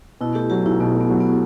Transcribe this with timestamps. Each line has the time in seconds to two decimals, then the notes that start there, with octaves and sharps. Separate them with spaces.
0.21 B2 E4
0.35 A3 G4
0.50 F#3 G4
0.65 B1 E4
0.80 B2 B3
0.95 A3
1.01 B3
1.10 F#3
1.20 B3